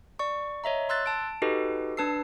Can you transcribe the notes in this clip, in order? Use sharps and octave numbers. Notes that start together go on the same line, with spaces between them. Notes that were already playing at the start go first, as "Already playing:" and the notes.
D5 C#6
C#5 D#5 E5 A#5
C6 E6 F#6 A6
A5 D7
D#4 F#4 G4 A4 B4 D#5
D4 B4 A5 E6 C7